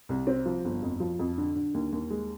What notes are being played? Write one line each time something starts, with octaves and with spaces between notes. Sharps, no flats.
C2
C4
F3
G1
F2
F3
F2
D3
D3
D#2
D#2
G#3